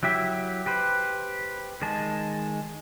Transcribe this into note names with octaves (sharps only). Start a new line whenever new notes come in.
F#3 E4 G4 E5
G4 B4 C5
D#3 G#3 G#4 A5